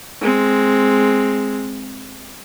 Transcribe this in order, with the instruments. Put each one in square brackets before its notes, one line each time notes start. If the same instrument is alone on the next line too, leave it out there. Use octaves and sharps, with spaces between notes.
[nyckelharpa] G#3 C4